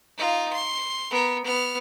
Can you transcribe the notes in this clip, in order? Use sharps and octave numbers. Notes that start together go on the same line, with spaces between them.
D#4 F4
C6
B3 A#4
B3 F6